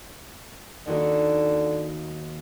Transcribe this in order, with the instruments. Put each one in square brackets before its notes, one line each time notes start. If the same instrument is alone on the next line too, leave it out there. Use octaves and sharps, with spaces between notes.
[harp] D#2 F#4 [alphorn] D3